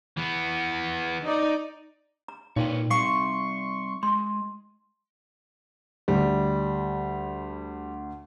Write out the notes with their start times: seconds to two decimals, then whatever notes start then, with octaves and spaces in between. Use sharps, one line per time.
0.17 E3 B3
1.24 D#4 D5
2.28 A#5
2.56 A#2 D#4 F4 B4 C#5 G5
2.90 G3 C4 F5 C6 C#6
4.03 G#3 C6
6.08 D2 G3